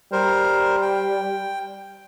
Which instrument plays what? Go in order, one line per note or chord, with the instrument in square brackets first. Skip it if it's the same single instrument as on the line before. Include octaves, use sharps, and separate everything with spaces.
[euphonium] G3 [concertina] A#4 C5
[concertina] G5